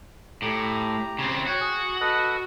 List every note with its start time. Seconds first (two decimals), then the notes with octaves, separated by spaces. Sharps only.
0.42 A2 G4 A#5
1.19 C#3 C4
1.47 F#4 C#5 G5
1.60 G#4
2.01 A4 B4 D#5